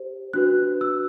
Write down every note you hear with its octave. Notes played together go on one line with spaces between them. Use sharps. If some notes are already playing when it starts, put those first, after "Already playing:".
Already playing: G4 C5
D4 F#4 B4 F#6
E6